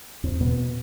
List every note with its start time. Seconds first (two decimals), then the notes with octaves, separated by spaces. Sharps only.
0.23 E2 C4
0.41 B2 B3
0.58 B3